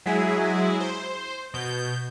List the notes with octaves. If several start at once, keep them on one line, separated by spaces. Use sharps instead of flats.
F#3 G#3 E4 G#4
C5
B2 G6